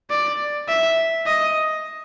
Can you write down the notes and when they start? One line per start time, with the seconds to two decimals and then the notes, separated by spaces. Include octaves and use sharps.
0.10 D5
0.68 E5
1.27 D#5